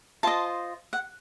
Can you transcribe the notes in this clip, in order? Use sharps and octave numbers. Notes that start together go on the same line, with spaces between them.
F4 C5 D#5 A5
F#5